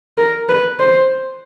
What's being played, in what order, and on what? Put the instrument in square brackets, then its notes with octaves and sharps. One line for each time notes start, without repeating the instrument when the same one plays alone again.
[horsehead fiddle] A#4
B4
C5